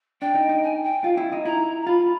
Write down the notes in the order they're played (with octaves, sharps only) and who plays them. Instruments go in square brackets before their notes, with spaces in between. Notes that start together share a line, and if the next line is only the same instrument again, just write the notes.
[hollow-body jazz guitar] D4 [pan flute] G5
[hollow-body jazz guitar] D#4
D#4
[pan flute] G#5
G5
[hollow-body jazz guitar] F4 [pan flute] F5
[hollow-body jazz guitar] E4
D#4
[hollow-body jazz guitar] E4 [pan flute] A#5
[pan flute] A#5
[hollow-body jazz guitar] F4 [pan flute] B5